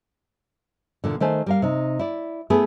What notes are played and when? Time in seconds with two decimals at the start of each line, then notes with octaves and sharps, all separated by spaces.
1.04 E2 A#2 D3
1.20 D#3 A3 C5 G#5
1.46 G3 A#4 F5
1.62 C3 D#4
1.99 E4 D5
2.50 A3 B3 E4 G#4 B4